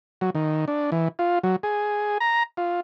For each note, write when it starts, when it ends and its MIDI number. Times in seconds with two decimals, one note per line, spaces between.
0.21 0.30 54
0.35 0.65 51
0.68 0.90 62
0.92 1.08 52
1.19 1.39 65
1.43 1.56 54
1.63 2.18 68
2.20 2.43 82
2.57 2.80 65